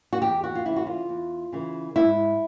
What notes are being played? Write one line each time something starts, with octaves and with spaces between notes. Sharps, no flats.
F#4
E2 G4
F#4
F4
C#3 E3 E4
F#4
F4
E2
C#3 E3
G#2 E4